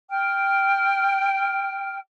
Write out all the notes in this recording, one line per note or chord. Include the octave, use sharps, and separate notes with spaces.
G5 F6